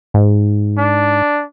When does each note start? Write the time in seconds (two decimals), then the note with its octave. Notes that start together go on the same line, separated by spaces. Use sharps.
0.14 G#2
0.78 D4